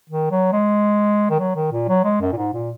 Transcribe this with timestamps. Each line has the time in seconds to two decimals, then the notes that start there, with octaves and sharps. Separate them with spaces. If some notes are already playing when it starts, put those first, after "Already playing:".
0.10 D#3
0.31 F#3
0.53 G#3
1.30 D#3
1.39 F#3
1.56 D#3
1.72 A#2
1.89 F#3
2.04 G#3
2.21 F#2
2.32 A#2
2.37 G#2
2.53 A#2